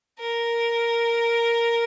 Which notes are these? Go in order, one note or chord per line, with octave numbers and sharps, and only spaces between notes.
A#4